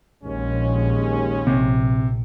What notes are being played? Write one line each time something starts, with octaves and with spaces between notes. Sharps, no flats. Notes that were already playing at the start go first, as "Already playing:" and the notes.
A#1 D#2 G#3 C#4
A#1 C3